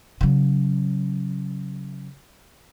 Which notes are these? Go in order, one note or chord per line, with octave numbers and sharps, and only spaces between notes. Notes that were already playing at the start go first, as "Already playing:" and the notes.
C#3 F#3